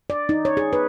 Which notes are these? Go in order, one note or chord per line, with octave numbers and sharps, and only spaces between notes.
D5
D#4
C#5
G#4
B4